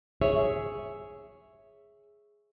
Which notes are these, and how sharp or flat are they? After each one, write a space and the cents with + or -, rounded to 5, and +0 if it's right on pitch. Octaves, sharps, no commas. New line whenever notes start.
G#4 +0 C#5 +0 E5 +0